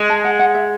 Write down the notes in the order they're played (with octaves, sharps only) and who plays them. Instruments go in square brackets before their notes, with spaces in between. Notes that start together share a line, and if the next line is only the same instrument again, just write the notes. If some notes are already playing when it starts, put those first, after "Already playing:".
Already playing: [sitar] G#3
[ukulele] A5
F#5
F#5
E5